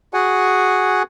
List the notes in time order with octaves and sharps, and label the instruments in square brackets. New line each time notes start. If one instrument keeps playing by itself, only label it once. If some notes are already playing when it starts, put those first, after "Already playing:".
[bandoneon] F#4 G#4 F#5 G#5